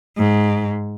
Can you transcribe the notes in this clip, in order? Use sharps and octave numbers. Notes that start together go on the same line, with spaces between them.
G#2